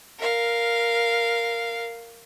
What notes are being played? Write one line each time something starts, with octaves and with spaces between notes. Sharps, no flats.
A#4 F5